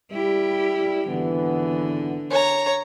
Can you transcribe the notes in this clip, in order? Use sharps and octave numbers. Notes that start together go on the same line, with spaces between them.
G3 E4 G4
G#1 D3 E3 B3
C#5 A#5